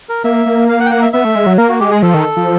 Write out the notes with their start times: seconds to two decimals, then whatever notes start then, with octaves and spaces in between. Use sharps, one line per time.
0.09 A#4
0.24 A#3 E5
0.46 A#3
0.69 F5
0.80 F#5
0.86 G5
0.91 F#5
1.02 E5
1.13 B3 E5
1.25 A3
1.35 G#3
1.46 F#3
1.58 A#3 A#4
1.69 F#4
1.80 G#3 G4
1.91 G#4
2.03 F3 A4
2.14 D#3
2.37 F3